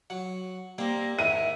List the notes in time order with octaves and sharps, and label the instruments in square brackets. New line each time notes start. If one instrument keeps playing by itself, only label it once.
[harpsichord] F#3 F#5
[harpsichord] G3 C4 [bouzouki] A#3
[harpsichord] G#2 D#3 [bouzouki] E4 [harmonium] E5 [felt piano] D#7